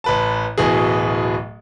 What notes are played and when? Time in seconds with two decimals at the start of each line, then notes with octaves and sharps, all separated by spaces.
0.04 A1 B4 A5
0.58 D1 B2 E3 G#4